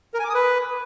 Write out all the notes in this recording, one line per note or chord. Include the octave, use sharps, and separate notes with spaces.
A#4
G#5
D6
D#6
B4